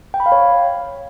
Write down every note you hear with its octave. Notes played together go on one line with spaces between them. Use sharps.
G5
B5
F5
C#5